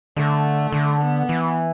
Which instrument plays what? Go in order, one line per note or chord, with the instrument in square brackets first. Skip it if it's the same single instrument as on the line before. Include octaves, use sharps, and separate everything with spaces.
[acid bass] D3 [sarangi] A3
[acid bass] D3
[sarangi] B3
[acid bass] E3